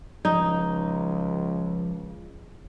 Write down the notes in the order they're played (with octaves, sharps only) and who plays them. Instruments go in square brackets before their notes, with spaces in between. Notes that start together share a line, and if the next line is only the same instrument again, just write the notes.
[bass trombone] C#2 [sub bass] F3 [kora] D#4